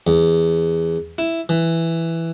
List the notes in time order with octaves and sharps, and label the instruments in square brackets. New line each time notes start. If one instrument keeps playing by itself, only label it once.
[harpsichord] E2
E4
E3